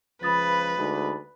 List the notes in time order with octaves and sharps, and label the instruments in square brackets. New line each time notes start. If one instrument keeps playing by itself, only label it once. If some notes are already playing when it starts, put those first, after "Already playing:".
[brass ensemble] C#2 F3 [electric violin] B4 [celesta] B5 D#6 A6
[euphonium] D2 [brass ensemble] G#3 D#4